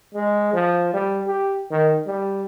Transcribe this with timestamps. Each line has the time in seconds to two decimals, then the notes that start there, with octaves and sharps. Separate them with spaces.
0.14 G#3
0.54 F3
0.94 G3
1.27 G4
1.71 D#3
2.07 G3